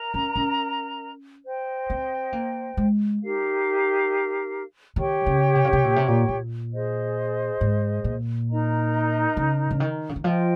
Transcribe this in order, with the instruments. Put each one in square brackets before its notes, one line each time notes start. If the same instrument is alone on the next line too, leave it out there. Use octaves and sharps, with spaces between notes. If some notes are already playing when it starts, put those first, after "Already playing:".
Already playing: [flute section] A#4 D#5 A#5
[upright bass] C#4
C#4
[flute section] C5 D#5 G5
[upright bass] C4
A#3
G#3
[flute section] D#4 G4 A#4 F5
[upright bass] D#3 [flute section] G4 C#5 G5 C#6
[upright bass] C#3
C3
C#3
C3
A#2
C3
A#2
A#2
[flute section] G#4 C5 D#5
[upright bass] G#2
A#2
[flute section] D#4 A#4 D#5 A#5
[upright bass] C#3
C#3
D#3
C#3
D#3
[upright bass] F3 [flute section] F4 C5 D#5 G5